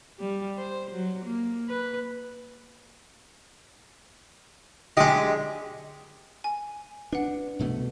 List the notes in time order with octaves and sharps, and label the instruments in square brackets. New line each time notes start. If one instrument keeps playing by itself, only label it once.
[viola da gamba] G3
C5
F#3
A#3
B4
[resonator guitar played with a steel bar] D3 F#3 G4 [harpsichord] G#3 D#5
[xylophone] G#5
[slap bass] D4 [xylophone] B4 F#5
[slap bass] C2 B2 A3